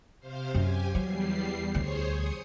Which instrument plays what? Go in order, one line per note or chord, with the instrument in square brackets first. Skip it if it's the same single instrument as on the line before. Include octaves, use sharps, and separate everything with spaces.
[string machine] C3 C5 F5
[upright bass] F#2 [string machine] G4 G#5
[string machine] E2 G3 C7 [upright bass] F#3
[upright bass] D2 [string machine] G#4 C5 C#5
[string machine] D#6 C#7